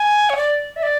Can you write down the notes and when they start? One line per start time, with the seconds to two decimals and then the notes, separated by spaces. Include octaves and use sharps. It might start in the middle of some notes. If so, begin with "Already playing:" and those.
Already playing: G#5
0.30 C#5
0.37 D5
0.76 E5
0.83 D5